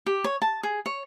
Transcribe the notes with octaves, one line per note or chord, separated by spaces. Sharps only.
G4
C#5
A5
G#4
C#5